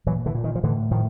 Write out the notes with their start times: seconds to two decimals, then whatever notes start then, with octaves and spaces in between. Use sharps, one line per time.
0.06 A#2 E3 F#3
0.26 D3 E3
0.35 A#2
0.44 D#3
0.55 F3
0.63 A2 D3 E3
0.91 A2 D#3 F3